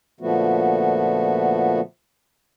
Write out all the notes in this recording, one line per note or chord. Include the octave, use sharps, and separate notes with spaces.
A#2 D3 F3 A3 B3 F#4